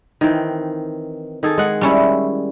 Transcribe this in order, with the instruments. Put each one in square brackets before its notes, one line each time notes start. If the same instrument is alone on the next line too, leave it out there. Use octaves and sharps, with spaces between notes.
[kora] D#3 E3 C4
D#3 G#4 A4
G#3 F#5
[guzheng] G3 C#4 E4